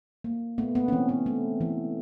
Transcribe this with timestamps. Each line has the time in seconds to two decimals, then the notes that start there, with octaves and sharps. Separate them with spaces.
0.24 A#3
0.58 A3 B3
0.75 B3
0.88 C#4
0.92 E3 C4
1.09 B3
1.26 A3
1.61 E3